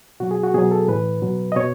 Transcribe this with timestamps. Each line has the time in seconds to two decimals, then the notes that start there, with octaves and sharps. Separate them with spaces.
0.20 B2 F#3 F#4
0.31 G#4
0.44 F#4
0.54 B2 F#3 G#4
0.71 A4
0.88 A2 E3 B4
1.22 B2 F#3
1.52 D#5
1.56 B2 C#5